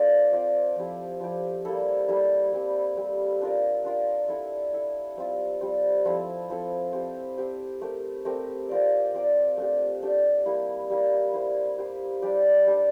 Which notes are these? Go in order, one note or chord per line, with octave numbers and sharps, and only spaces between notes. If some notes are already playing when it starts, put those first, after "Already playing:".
Already playing: C4 F4 A4 D5
C4 F4 A4 D5
F3 C4 E4 G4
F3 C4 E4 G4
G3 A#3 E4 A4
G3 A#3 E4 A4
G3 C4 G4
G3 C4 G4
D4 F4 A#4
D4 F4 A#4
E4 A4 E5
E4 A4 E5
G3 C4 F4
G3 C4 F4
F3 C4 E4 A4
F3 C4 E4 A4
C4 G4 C5
C4 G4 C5
A3 C4 G4 A#4
A3 C4 G4 A#4
C4 F4 A#4 D5
C4 F4 A#4 D5
A3 D4 G4
A3 D4 G4
G3 A#3 E4
G3 A#3 E4
E4 G4 C5
E4 G4 C5
G3 D4 G4 D5
G3 D4 G4 D5